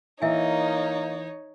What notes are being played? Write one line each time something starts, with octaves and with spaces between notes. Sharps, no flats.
E3 A#3 D#4 A#4 C#5 D#5 E5 G#5